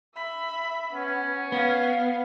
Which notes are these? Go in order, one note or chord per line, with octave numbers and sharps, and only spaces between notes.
E5 B5
B3 C#4
B3 F5